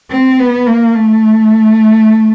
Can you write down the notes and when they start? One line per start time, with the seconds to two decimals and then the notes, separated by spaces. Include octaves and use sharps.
0.11 C4
0.39 B3
0.67 A#3
0.94 A3